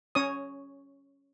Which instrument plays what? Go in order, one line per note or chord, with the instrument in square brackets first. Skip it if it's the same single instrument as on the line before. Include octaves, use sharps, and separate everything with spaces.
[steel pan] C#4 C#5 D#6